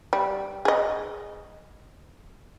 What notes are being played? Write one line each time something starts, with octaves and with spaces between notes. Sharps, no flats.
G3
G#4 D#5